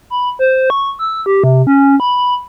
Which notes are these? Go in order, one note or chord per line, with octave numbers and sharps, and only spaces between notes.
B5
C5
C#6
E6
G4
C3
C#4
B5